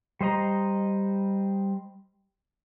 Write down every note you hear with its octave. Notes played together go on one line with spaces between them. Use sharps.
G3 C5 D#5 A#5